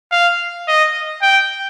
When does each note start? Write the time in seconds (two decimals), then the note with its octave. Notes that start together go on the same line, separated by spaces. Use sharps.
0.11 F5
0.68 D#5
1.22 G5